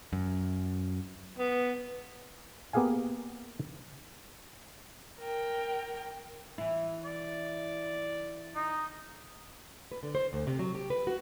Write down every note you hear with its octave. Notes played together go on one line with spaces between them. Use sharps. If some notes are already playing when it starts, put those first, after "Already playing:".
F#2
B3
A#3 B3 G4 G#4 F5 G#5
A#4 G5
E3 E4
D5
D#4
B4
D3
C5
D2
C3
F#3
G4
B4
F#4